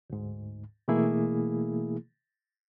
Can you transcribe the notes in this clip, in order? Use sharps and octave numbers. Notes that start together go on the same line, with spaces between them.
D2 G#2
B2 E3 A3 A#3 E4 G#4